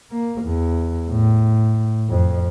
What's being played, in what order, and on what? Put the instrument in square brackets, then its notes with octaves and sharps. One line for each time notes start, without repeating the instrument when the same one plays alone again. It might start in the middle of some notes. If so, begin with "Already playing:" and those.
[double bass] A#3
E2
A2
F2